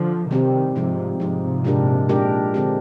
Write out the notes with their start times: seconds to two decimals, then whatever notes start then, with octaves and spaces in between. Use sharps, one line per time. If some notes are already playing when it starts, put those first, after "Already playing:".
Already playing: D3 F3
0.30 C3 D#3 G3 C4 G4
0.75 G#2 C3 F3 G#3 D#4
1.20 G#2 C3 F3 G#3 D#4
1.64 A#2 G#3 D4 G4 A#4
2.09 A#2 G#3 D4 G4 A#4
2.54 D3 G#3 C4 G4